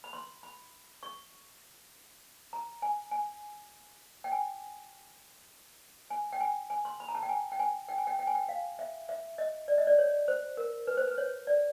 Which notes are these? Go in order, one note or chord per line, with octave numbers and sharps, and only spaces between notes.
B5
C6
B5
C#6
A#5
G#5
G#5
G5
G#5
G#5
G5
G#5
G#5
C6
B5
A#5
A5
G5
G#5
G5
G#5
G5
G#5
G5
G5
G#5
G5
F5
E5
E5
D#5
D5
D#5
D5
C#5
C5
A#4
B4
C5
B4
C#5
D5